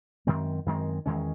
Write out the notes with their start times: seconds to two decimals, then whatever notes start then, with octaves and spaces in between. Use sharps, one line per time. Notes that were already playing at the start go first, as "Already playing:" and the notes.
0.27 F#2 D#3 G#3 C4
0.66 F#2 D#3 G#3 C4
1.06 E2 D#3 G#3 C#4